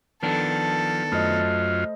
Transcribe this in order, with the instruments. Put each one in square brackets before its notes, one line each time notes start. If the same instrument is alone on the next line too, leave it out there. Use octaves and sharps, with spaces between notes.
[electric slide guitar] D#3 B3 D4 [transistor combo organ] F3 [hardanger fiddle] A4
[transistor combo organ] F#2 F4 [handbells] A3 C5 D#5